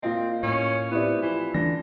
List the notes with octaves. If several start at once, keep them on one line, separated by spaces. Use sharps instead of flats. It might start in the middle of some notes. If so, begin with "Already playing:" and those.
A#2 C4 F4 D#5
A2 C#4
B3 C4 E4 G4 D5
E3 F3
D3 E3 A3 D4 A#6